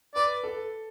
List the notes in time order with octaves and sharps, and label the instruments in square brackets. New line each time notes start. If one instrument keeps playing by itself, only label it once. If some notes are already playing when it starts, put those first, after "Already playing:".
[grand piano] B4 [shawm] D5
[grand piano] A4